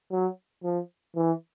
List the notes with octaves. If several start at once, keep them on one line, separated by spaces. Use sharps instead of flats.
F#3
F3
E3